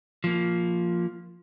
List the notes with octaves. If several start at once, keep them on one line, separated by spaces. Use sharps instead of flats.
F3 A#3